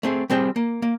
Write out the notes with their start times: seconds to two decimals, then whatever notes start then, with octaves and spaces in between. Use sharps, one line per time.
0.03 A3 C4 G#4
0.30 G3 C4 G#4 G5
0.56 A#3
0.82 A#3